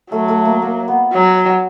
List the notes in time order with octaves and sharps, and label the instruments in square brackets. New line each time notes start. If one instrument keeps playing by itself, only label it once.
[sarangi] F#3 [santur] A3
[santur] A3
A#3
A#3
B3
[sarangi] F#3